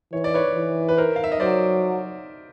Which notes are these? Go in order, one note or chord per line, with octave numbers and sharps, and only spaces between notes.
E3 C#5
D5
B4 C#5
E3
B4
A#4 C5
F5
E5
D#5
F#3 C5 D5